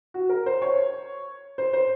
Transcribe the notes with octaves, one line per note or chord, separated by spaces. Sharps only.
F#4
A#4
C5
C#5
C5
C5